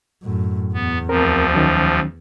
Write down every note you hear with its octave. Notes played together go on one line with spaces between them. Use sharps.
F#2 A2
E2 B3
D2 F3 C4 A#4
D#3 F#3 C#4